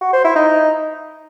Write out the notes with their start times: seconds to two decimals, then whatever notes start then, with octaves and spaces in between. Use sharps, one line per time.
0.02 F#4
0.13 C5
0.24 E4
0.36 D#4